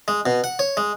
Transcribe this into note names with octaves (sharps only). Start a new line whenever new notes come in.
G#3
B2
F#5
C#5
G#3